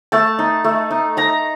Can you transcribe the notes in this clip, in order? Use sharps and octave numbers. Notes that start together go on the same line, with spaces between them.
A3 A5
D#4
A3
D#4
D#4 A#5